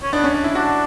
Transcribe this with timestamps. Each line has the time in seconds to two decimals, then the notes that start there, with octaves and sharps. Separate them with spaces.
0.02 C#4
0.13 B3 D4
0.24 C#4
0.34 D4
0.44 E4
0.55 D4 F#4